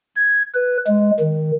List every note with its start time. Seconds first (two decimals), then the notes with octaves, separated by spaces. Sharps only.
0.15 G#6
0.54 B4
0.87 G#3
1.19 D#3